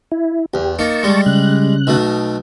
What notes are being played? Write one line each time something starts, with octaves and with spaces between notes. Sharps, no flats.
E4
E2 G4
A#3 D#4 A5 C#6
G3 G#3
C#3 F#6
B1 B2 A3